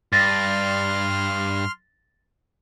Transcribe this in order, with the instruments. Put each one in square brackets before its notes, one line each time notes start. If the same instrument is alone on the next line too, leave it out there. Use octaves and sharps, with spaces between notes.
[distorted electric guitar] G2 [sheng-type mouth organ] C6 F6 [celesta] A6 A#6